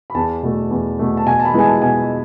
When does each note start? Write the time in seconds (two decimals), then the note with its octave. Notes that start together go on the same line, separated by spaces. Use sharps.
0.10 B5
0.14 E2 A5
0.43 B2 A3
0.71 E2
0.99 B2 A3
1.17 A5
1.26 B2 G#5
1.40 A5
1.45 B5
1.54 G#3 B3 E4 G#5
1.63 A5
1.82 B2 G#5